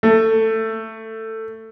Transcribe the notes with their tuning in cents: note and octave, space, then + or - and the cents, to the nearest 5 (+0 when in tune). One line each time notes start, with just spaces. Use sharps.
A3 +15